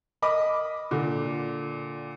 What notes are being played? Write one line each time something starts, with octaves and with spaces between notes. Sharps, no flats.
A#4 D#5 B5 D6
A#2 D3